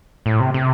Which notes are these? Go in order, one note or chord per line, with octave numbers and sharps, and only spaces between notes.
A2
C3
C3